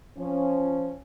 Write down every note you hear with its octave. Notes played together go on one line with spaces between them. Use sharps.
F3 C#4